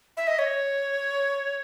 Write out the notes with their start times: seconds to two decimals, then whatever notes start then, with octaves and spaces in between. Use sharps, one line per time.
0.17 E5
0.27 D#5
0.39 C#5